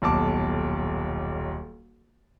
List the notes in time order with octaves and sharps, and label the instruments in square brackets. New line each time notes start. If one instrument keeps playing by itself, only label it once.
[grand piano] D#1 B1 A5 D6